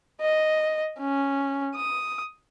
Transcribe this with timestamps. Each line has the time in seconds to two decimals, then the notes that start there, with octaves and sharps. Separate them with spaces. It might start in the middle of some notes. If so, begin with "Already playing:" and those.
0.21 D#5
1.00 C#4
1.76 D#6